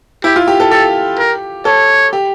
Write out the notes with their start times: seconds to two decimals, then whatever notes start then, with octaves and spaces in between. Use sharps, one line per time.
0.24 E4 G4
0.36 F4
0.48 G4
0.60 A4
0.71 G4 A4
1.19 A#4
1.65 A4 C#5
2.13 G4